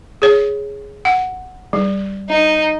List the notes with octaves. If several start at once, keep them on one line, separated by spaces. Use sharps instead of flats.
G#4 C#5
F#5
G3
D#4